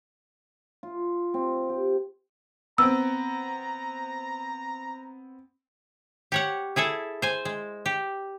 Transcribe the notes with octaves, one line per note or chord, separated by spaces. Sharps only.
F4
C4
G4
B3 C4 A#5 E6
G4 C#5 F#5
E4 G#4 A4 E5
C5 G#5
G#3
G4